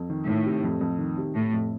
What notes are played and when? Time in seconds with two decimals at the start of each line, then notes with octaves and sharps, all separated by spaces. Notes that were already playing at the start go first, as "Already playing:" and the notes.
Already playing: F2
0.10 D#3
0.27 A2 D#3
0.46 C3
0.64 F2
0.81 F2
0.99 D#3
1.18 C3
1.35 A2 C3
1.53 F2